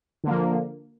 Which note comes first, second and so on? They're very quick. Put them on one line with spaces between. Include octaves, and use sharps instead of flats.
D3 A#3 F3